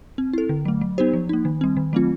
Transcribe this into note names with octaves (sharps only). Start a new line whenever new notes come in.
C4
E4 A4
D3
F#3 A3
F#3
B3 D#4 G4 C5
F3
A#3 D#4
D#3
G3 C4
D#3
F#3 A3 C4 F4